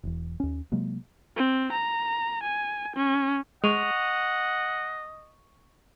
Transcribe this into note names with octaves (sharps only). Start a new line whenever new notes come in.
E1 E2
D#2 C#4
C3 F#3 G#3 A#3
C4
A#5
G#5
C#4
G#3 D#5 F#5 C#6 D#7 F7